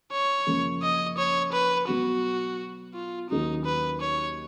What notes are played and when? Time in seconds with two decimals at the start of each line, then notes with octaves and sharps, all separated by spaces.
0.12 C#5
0.46 F#2 C#3 F3 A#3 C#4
0.82 D#5
1.18 C#5
1.52 B4
1.88 B2 F#3 B3 F#4
2.94 F4
3.30 D#2 D#3 F#3 C#4 D#4 F#4
3.65 B4
4.01 C#5